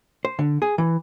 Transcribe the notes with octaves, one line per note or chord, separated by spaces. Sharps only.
C5
D3
G#4
E3